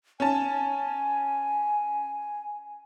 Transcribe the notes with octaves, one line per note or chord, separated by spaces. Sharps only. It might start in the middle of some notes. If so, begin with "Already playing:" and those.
C#4 G#5 A5